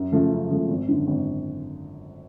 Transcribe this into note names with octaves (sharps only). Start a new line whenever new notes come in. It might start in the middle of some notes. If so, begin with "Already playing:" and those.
Already playing: F#2
C#3 F3 A3
F#2
C#3 F3 A3
G#1
F#2 D3
G#1